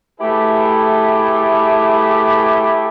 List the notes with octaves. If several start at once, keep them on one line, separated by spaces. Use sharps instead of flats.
A3 E4 G4 G#4 B4